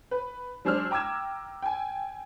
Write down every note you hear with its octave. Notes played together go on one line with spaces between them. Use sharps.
B4
F#3 G#3 D4 C5 E6 F6
G5 A#5 D6 E6 G#6 E7
G5 G#5